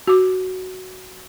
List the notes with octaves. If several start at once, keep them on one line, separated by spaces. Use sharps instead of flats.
F#4 D6